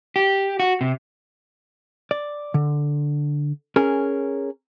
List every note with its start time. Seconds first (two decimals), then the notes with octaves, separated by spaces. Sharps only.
0.16 G4
0.60 F#4
0.81 C3
2.11 D5
2.54 D3
3.76 C#4 G#4 A#4